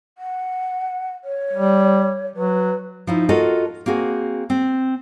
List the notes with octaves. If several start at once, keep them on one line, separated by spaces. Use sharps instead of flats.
F#5
C#5
G3
F#3 B4
F3 D#4 E4
F4 F#4 A4 A#4 D#5
A#3 C4 F#4 G#4
C4